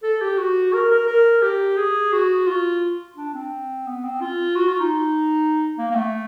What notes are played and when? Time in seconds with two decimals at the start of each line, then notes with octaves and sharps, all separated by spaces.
0.03 A4
0.21 G4
0.38 F#4
0.73 A#4
0.91 A#4
1.07 A#4
1.42 G4
1.77 G#4
2.12 F#4
2.47 F4
3.17 D4
3.34 C4
3.86 B3
4.04 C4
4.21 F4
4.56 F#4
4.68 F4
4.79 D#4
5.78 A#3
5.91 A#3
5.95 A3